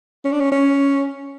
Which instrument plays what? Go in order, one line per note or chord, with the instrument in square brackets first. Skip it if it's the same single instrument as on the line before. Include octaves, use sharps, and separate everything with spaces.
[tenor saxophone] C#4
D4
C#4
C#4